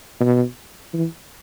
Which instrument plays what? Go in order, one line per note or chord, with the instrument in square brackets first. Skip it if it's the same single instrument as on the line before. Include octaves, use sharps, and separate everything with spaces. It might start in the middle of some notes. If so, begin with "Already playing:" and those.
[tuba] B2
E3